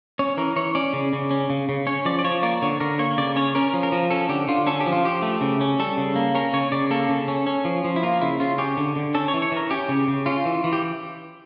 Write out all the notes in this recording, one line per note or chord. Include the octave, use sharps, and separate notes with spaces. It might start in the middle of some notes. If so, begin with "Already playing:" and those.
C#4 C#5
E3 A#4
E3 C#5
C#4 D5
C#3
C#3
C#4
C#3
C#3
C#4 C#5
F3 D5
D5
F3 C#5
A#3 D5
D3 C#5
D3 A#4
A#3 C#5
C#3 D5
C#4 C#5
C#4 A#4
F3
A#4
F3
C#4 A4
D3 G4
D3 F4
C#4 A4
G4
F3
F4
F3 G4
A3
C#3
C#4
G3 A4
C#3
A#3
C#4 A#4
C#3 C#5
C#3 D5
A#3 A4
C#3
C#4
C#4
F3
F3
E4
A#3 F4
C#3 E4
C#3 F4
C#4 G4
D3
D3
C#4 A4
C#5
E3
C#5
E3 A#4
C#4 G4
C#3
C#3
C#4 F4
E3
E3
G4